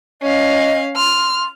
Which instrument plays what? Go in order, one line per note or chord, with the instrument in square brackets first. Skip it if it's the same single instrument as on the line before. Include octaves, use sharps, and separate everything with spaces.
[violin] C#4 F5 [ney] D#5
[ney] C6 [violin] F6